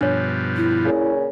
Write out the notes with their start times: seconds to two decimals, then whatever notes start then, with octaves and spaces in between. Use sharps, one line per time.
0.01 G2 B2 F3 D4 C#5
0.56 E4
0.86 A#2 C#3